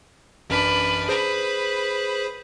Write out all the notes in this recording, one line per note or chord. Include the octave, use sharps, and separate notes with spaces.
A1 F#2 D4 B4 F6
G#4 B4 C5